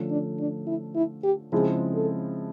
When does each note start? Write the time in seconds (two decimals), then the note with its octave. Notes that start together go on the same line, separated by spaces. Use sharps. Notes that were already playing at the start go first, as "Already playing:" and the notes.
Already playing: D3 F3 A3 C#4 F4
0.11 D4
0.39 D4
0.67 E4
0.95 E4
1.24 G4
1.52 C#3 F3 G#3 C4 E4 G#4
1.95 A4